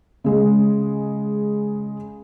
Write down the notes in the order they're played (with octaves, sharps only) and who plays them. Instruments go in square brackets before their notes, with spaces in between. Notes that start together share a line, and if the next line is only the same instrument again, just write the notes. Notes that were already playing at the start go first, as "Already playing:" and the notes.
[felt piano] C#3 G#3